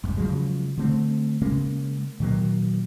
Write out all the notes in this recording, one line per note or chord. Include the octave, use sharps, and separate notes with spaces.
A1 E2 G2
C#3 F3 F#3 G#3
D3 A3 C4
C#3 G#3 A#3 C#4
A#2 D#3 F#3 A#3